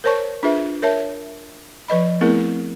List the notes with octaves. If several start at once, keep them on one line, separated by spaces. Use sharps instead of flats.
A#4 C5 C#5 A5 C#6
D4 F4 G#4 B4 E5
A#4 C#5 E5 A5
F3 B4 D#5 B5
A3 B3 C4 E4 G#4 A#4